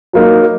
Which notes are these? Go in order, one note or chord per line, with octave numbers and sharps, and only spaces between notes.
F#3 A#3 D#4